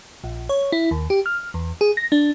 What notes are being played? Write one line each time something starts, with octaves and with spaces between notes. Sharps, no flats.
A#1
C#5
E4
D#2
G4
F6
E2
G#4
A#6
D4